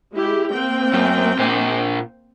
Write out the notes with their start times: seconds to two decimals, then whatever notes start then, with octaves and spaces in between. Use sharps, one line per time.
0.13 G#3 E4 G4
0.52 A#3 C4 G5
0.93 F#2
1.39 A#2 C5